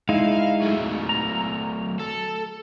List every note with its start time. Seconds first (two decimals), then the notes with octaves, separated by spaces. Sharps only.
0.09 G#3 D#4 E4 F5
0.62 F#3 A3
1.09 A#5
1.99 A4